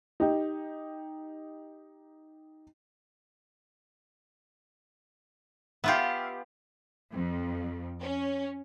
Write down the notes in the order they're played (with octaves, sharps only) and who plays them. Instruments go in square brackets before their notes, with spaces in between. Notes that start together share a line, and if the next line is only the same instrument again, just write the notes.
[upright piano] D#4 G4
[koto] B3 F4 G4 [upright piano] E5 F5
[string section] F2
C#4